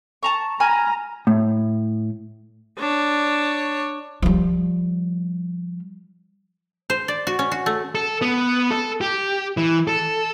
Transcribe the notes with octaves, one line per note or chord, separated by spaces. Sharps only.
A5 A#5 C#6
G#5 A#5 B5 F6
A2
D4 C#5
F3 G3
C5
D5
F#4
C#4
F#4
A3
A4
B3
A4
G4
E3
A4